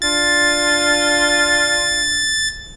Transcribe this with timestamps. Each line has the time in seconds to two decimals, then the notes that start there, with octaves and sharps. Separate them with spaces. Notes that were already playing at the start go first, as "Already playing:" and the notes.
0.02 D4 F4 A6